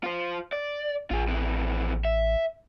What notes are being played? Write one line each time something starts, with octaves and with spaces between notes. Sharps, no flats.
F4 C5
D5
A1 F4 G#4
F2 E3
E5